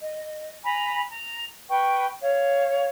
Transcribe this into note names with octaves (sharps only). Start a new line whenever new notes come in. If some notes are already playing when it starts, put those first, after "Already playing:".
D#5
G#5 A#5 B5
A#5
B4 G5 C#6
C#5 F5